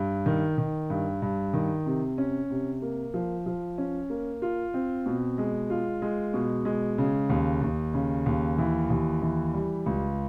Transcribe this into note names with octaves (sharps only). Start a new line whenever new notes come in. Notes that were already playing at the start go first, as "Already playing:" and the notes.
Already playing: G2
D#3
D#3
G2
G2
D#3
C3
C#4
C3
A#3
F3
F3
C#4
A#3
F4
C4
B2
G#3
F4
G#3
B2
G#3
C#3
D#2
D#2
C#3
D#2
E3
D#2
E3
G3
C#2